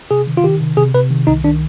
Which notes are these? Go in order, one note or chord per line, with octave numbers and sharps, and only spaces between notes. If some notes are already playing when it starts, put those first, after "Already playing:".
C3 G#4
D#3
F4
D#3 G4
C3
C3 G#4
C3 B4
D#3
C2 D#4
D#3 D4